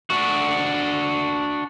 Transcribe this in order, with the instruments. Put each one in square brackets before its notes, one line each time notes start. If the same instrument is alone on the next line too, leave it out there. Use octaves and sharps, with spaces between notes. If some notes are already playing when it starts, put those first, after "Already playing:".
[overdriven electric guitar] D4 F#4